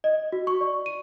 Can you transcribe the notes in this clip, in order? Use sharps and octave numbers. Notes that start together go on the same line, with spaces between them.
D#5
F#4
C#6
D5
D#7